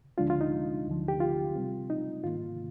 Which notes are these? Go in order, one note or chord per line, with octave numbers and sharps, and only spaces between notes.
D2 D3 F3 G#3 D4 F4
F4
D#4
D2 D3 F3
G4
F4
C3 G3 C4
D#4
G#2 D#3 A#3 F4